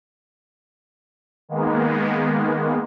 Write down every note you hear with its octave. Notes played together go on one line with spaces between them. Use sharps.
D#3 G#3 A#3 B3